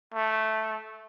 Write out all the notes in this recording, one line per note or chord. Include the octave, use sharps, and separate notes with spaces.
A3